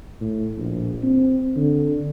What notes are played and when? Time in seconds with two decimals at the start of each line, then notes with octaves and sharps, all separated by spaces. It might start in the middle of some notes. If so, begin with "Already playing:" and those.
0.21 A2
0.58 A#1
1.03 C4
1.56 D3